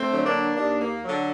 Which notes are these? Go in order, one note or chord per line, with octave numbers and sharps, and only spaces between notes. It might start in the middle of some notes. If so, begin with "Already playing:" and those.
Already playing: A3 C4
D3 F#3
A#3 D4
D#2 A#3 D4
A#3
D3 F#3